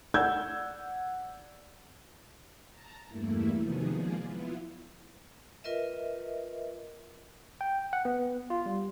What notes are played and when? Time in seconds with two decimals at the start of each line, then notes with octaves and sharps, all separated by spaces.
0.14 D5 F#5 E6 G6 G#6
2.69 A5 A#5
3.07 E2 G2 A3 A#3 E4
3.57 C3 D#3 F3 F#3 B3 G#4
3.93 F3 G#3 A#3 G#4 D5
4.21 B3 E4 F4
5.64 F4 A#4 B4 D#5 E5
7.61 G5
7.93 F#5
8.05 B3
8.50 F4
8.66 G3